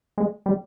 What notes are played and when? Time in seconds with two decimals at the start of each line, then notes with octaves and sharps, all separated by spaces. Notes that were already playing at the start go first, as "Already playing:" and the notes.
0.18 G#3
0.46 G3